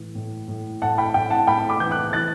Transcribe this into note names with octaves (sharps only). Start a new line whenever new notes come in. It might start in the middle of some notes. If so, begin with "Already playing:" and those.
Already playing: A2 E3
A2
A2
A2 F#5 A5
G5 B5
A2 G5
F#5 A5
A2 G5 B5
B5 D6
E3 G6
D6 F#6
E3 F#6 A6